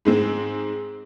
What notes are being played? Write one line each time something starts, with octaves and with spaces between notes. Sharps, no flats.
G#2 G#3 C4